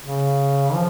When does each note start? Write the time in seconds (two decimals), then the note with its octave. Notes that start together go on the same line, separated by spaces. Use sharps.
0.05 C#3
0.74 F3